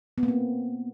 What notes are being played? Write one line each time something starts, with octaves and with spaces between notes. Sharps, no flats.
B3
A#3
C4